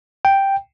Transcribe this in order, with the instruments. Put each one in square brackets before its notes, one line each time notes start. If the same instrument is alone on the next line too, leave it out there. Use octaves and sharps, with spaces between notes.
[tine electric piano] G5